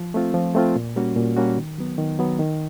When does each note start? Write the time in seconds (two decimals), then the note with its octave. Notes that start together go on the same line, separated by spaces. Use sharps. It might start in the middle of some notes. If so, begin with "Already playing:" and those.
Already playing: F3
0.14 A3 C4 F4
0.34 F3
0.55 A3 C4 F4
0.76 A#2
0.96 G3 A#3 C#4 F#4
1.16 A#2
1.37 G3 A#3 C#4 F#4
1.58 D#3
1.78 F#3 B3
1.98 D#3
2.19 F#3 B3
2.39 D#3